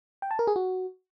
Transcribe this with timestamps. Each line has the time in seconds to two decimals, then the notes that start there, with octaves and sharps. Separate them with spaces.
0.22 G5
0.31 A5
0.39 A#4
0.47 G#4
0.56 F#4